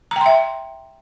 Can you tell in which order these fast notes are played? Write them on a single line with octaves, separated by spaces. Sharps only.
A#5 G5 C6 E5